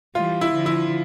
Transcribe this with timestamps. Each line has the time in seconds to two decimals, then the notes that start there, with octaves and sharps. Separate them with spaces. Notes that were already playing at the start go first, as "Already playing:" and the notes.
0.15 E3 G3 F4
0.41 E4
0.53 D3 F3
0.66 E4